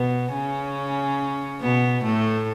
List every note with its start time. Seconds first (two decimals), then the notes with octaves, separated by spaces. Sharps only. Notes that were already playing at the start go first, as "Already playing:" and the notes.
Already playing: B2 B3
0.33 C#3 C#4
1.61 B2 B3
2.04 A2 A3